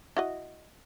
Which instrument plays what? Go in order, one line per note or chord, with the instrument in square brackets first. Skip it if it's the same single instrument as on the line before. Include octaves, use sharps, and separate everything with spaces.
[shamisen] E4 F#4 D#5